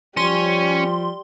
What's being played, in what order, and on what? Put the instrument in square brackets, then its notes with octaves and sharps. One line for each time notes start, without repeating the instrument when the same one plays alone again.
[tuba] F3 [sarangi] G3 [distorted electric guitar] C#4 [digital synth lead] C6